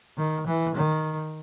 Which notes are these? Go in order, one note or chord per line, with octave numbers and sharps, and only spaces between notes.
D#3
E3
D#3